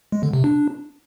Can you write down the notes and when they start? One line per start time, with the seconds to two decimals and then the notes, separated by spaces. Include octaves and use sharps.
0.12 G#3
0.23 D3
0.33 C3
0.44 D4